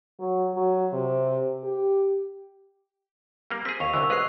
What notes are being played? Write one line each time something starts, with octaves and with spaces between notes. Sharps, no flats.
F#3
F#3
C3
G4
G3 A#3
C4 G#4 B6
D#2 C#6 F7
C2 D3 E3 C#6 E6
B1 G#3 B4 E6 F#6 C7